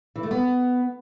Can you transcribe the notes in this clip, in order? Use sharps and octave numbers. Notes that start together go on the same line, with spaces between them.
E3
A3
B3